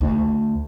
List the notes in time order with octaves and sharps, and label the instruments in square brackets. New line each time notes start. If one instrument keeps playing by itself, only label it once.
[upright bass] D2